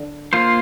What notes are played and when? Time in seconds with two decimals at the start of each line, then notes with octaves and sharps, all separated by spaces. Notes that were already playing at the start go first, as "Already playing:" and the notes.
Already playing: D3
0.33 A#3 F4 C5